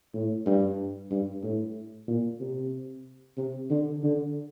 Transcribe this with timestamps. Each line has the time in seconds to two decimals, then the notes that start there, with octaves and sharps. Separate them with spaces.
0.14 A2
0.46 G2
1.11 G2
1.43 A2
2.08 A#2
2.40 C3
3.38 C3
3.70 D3
4.03 D3